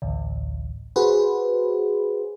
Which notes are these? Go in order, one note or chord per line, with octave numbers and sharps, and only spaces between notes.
A1 D2
F#4 G#4 B4 C5